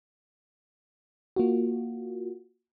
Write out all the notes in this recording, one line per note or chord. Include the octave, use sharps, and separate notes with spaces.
A#3 F4 F#4